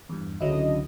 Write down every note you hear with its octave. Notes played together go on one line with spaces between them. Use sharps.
E2 G2
C#2 D3 F#3 E4 D#5